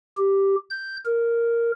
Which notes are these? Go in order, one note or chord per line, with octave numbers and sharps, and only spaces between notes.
G4
G6
A#4